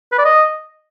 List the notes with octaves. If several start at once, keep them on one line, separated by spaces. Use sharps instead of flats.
B4
D5
D#5